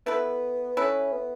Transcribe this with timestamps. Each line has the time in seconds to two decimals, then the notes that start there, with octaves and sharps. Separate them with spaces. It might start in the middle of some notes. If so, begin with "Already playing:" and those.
0.06 A3 B3 E4 B4
0.77 A3 C#4 E4 B4
1.12 B3